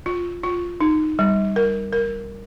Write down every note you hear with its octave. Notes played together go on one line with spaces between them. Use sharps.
F4
F4
D#4
G3
A#4
A#4